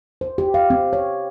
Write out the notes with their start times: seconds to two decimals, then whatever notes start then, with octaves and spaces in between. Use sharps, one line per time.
0.21 C5
0.38 G4
0.54 F5
0.70 C4
0.93 C#5